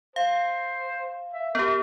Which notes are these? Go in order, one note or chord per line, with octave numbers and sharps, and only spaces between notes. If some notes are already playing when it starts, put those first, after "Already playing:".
C5 F5
E5
B3 G4 A#4